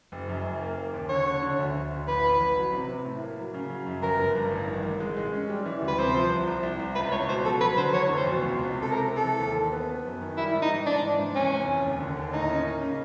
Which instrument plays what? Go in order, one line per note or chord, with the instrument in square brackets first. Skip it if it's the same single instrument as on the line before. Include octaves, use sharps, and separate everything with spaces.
[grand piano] F#1
F#2
F#1
A#3
A#3
D#2
[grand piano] D3 [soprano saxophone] C#5
[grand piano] D3
D3
D2
D2
D2
[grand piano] A1 [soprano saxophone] B4
[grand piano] A1
A1
F#3
C3
C3
A2
A#3
F#3
C#3
F#3
F#2
[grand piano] G1 [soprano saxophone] A#4
[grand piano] G1
G2
A1
D#3
A1
G#3
G#3
C#4
G3
E3
D2
[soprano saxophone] B4
[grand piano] C3 [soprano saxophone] C5
[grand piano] F3
C2
C2
C2
C2
[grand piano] C#2 [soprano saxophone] B4
[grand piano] C#2 [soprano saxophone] C#5
[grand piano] B2 [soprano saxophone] C5
[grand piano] F#3 [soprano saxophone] A4
[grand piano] F#3 [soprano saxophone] B4
[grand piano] D3 [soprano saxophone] C5
[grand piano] E2 [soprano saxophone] C#5
[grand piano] F1
[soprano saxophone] C5
[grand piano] B2
C#2
C#2
C3
[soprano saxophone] A4
[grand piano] C3 [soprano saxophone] A#4
[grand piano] C3
[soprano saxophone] A4
[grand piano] E3
D#2
D#3
B3
B3
F#2
D#3
[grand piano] G3 [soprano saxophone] E4
[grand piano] G#2
[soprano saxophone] D#4
[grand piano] E3
[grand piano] G#2 [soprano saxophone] D4
[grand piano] E3
G#2
[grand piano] E2 [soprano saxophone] C#4
[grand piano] C3
F1
D#2
D3
D#2
[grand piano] A2 [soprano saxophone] D#4
[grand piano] C#4
A#3
C#3